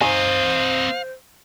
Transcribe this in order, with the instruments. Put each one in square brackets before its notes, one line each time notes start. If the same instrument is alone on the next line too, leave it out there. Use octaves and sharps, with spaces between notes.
[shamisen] D#3 G#5 [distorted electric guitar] C4 D#5 [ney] C5 [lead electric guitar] F5